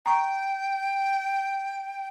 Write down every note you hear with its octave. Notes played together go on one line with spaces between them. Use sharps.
G5 A#5 C#6